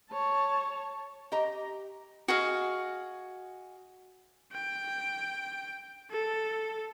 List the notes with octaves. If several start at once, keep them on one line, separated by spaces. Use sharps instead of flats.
C#5 A5
G4 D#5 A#5
F#4 G#4 D#5 F5
G5
A4